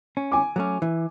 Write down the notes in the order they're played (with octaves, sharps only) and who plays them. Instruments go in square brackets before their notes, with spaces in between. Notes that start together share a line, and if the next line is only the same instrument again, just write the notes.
[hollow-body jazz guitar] C#4
[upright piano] G#5 D6
[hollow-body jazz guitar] F#3 A3 C#4
E3